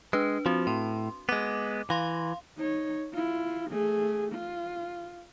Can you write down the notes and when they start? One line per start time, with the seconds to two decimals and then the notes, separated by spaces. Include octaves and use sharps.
0.13 G#3 D4 B4
0.46 F3 C4 F#4
0.67 A2 C6
1.29 G#3 B3 D6
1.90 E3 F5 C6
2.58 D#4 C#5
3.13 E4 F4
3.71 A3 G#4
4.33 F4